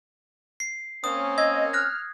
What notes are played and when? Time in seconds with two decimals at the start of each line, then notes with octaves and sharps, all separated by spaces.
0.60 C7
1.04 A#3 C4 C#4 D#6
1.38 D#5 E6 G#6
1.73 F6 F#6 A#6